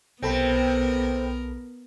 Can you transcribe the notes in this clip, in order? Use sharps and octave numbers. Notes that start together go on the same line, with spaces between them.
B1 C3 B3 C4 A4 A#4 B5